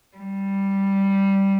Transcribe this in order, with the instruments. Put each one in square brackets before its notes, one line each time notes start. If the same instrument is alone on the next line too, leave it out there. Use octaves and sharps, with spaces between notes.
[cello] G3